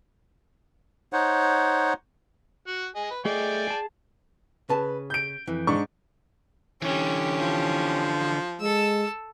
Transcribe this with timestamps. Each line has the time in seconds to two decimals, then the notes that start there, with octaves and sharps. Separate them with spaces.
1.13 D#4 C5 C#5 F#5
2.67 F#4 F#5
2.96 G#4 D#5
3.11 B4
3.25 A3 G#4 D5 D#5 G5 G#5
3.67 G#4 A5
4.69 C#3 B4 A5
5.10 G6 D7
5.47 F2 E3
5.67 G#2 D4 C#6
6.82 D3 E3 C#4 G4
7.40 F3
8.61 G#3 A4 E6